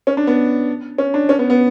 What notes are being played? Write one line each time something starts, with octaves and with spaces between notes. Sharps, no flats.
C#4
D4
B3
C#4
D4
C#4
B3
B3